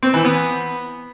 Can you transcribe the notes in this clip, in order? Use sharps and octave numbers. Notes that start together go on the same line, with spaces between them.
C4
E3
B3